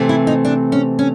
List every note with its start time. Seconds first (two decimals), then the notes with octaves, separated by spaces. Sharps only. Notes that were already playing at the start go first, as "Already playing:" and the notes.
Already playing: C3 E3 A3 C4
0.09 E4
0.27 D#4
0.45 D4
0.72 C#4
0.99 C#4